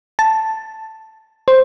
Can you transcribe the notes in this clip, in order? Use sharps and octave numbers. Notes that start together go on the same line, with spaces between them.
A5
C5